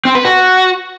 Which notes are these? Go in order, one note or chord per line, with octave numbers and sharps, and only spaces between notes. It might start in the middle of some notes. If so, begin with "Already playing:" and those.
C4
B4
F#4